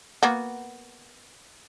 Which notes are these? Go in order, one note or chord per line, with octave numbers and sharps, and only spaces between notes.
A#3 B3 F#4